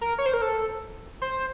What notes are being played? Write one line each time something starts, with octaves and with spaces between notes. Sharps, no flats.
A#4
C#5
C5
A#4
A4
C5